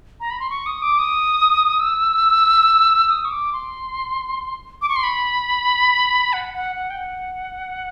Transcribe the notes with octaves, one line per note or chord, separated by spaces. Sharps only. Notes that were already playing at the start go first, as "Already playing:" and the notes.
A#5
B5
C6
C#6
D#6
D6
D#6
E6
D#6
C#6
D6
C6
D6
C#6
C6
B5
F#5
F#5
F#5
G5
F#5